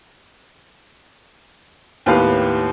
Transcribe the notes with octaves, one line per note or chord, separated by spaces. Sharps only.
D#2 A2 B3 G4 B4 F5